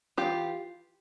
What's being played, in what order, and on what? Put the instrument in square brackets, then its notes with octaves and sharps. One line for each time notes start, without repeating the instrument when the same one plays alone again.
[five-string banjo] E3 F4 G4